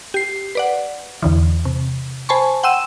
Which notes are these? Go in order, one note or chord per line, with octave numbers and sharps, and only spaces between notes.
G4 C7
B4 D5 F#5
E2 D3 E3
C3
C5 G#5 A5 B5 C#6
F#5 G5 C6 E6 D#7 E7